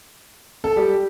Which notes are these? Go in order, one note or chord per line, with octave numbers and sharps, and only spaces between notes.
A4
G3 G4